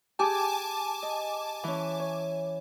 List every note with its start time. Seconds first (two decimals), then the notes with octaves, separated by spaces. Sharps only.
0.19 G4 G#4 G#5 A5 D6
1.03 D#5
1.64 E3 C#4
1.99 C#5